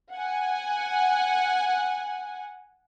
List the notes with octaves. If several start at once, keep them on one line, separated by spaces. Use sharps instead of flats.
F#5 G#5